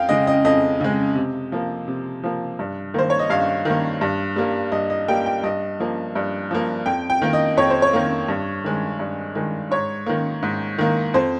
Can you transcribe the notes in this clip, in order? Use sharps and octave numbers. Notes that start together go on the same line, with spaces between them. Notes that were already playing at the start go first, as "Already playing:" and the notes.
Already playing: F2 F5 G5
C#3 G#3 D#5
D#5
F2 D#5
C#3 G#3
C3
F3 A#3
C3
F3 A#3
G2
D#3 A#3 C5
C#5
D#5
G2 F5
D#3 A#3
G2
G3 A#3
G2 D#5
D#5
G3 A#3 G5
G5
G2 D#5
F3 A#3
G2
F3 A#3
F2 G5
G5
D#3 A#3
D#5
F2 C#5
C5
C#5
D#3 A#3
G2
D#3 G#3
G2
D#3 G#3
G#2 C#5
D#3 A#3
G#2
D#3 A#3
F2 C5